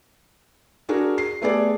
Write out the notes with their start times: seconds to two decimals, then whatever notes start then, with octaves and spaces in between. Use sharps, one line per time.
0.89 D4 F#4 G#4 A#4
1.18 C7
1.42 A3 B3 G4 G#4 D5